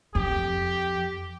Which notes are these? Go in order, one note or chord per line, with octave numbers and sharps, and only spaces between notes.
F2 G4